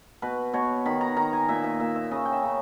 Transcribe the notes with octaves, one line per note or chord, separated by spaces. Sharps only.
B2 B4
B2 C#5
D#3 B5
A#5
D#3 A#5
G#5
A#2 E5
E5
A#2 E5
E5
C#3 D#5
G5
E5
C#3